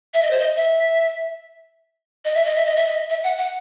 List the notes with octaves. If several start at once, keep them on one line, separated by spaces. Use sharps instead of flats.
E5
D#5
C5
D#5
E5
D#5
E5
D#5
E5
D#5
E5
D#5
E5
F#5
F#5